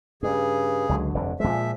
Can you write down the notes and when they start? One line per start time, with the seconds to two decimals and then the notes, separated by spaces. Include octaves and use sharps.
0.23 G2 C#3 G#4
0.89 C#2 D3 F#3
1.14 F1 G2 D3
1.40 A#2 F3 G#3 E5